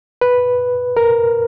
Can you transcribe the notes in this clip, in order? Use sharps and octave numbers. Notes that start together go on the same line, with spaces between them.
B4
A#4